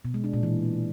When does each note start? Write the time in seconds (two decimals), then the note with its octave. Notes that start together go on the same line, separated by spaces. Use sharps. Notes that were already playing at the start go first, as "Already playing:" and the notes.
0.05 B2
0.14 G#3
0.24 D4
0.33 A#2
0.43 E3